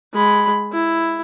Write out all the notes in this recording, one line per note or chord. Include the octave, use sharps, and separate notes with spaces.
G#3 B5
E4